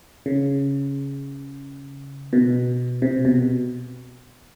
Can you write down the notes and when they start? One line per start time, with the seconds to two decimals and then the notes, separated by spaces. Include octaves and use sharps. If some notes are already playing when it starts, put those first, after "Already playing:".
0.26 C#3
2.33 B2
3.02 C3
3.25 B2